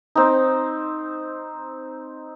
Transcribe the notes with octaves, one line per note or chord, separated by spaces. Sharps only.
C4 D#4